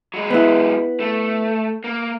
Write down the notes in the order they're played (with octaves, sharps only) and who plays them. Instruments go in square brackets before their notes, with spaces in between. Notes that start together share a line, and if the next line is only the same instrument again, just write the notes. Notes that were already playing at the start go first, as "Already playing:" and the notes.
[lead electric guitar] F#3 G#3
[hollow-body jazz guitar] B3 E4
[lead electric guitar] A3
A#3